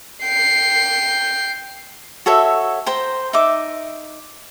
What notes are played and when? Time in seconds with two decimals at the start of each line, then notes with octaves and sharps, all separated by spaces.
0.24 G5 C7
2.26 F#4 A4 C#5 E5
2.86 C5 G5 A#5
3.33 D#4 E5 D6